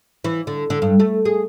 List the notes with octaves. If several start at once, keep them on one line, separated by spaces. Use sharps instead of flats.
E3
D3
D3
G2
A3
G#4